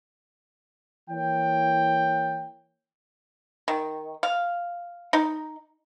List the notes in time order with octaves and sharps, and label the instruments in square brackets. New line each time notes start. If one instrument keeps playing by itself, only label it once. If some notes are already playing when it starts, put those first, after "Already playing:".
[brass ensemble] E3 A#3 C#5 G5
[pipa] D#3
F5
D#4